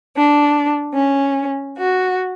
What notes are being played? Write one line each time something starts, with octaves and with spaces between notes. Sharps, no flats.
D4
C#4
F#4